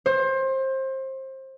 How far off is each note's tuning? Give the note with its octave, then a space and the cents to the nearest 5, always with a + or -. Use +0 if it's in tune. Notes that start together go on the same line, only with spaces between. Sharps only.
C5 +25